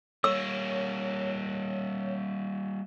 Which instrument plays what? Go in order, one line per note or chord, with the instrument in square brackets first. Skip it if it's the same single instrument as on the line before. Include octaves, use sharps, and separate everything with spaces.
[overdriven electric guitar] G3 A#3 [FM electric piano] C#5 [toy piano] E6